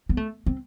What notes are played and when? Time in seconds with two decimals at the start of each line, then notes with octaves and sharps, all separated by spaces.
0.09 B3
0.17 A3
0.46 C4